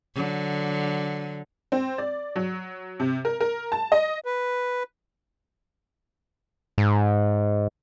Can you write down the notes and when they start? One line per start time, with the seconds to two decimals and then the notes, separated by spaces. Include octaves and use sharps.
0.15 D3 F#3
1.72 C4
1.98 D5
2.36 F#3
3.00 C3
3.25 A#4
3.40 A#4
3.72 A5
3.92 D#5
4.24 B4
6.78 G#2